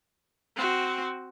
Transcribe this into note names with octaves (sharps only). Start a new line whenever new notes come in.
C4 F#4